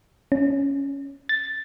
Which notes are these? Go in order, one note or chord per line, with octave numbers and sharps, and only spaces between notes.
C#4
A6